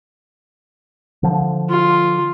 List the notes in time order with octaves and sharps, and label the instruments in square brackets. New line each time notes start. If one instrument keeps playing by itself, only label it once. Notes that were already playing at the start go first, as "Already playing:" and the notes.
[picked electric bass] D3 F3
[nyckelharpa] F4